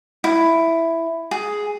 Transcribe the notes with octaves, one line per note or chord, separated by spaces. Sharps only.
E4
G#4